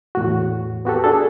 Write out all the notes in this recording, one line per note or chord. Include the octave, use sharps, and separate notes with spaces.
E2 A2 F#4
B3 F#4 G4 A4
D4 G#4 A4